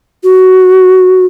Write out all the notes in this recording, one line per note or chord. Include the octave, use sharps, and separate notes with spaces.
F#4